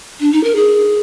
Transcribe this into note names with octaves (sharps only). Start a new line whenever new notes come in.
D4
D#4
A#4
G#4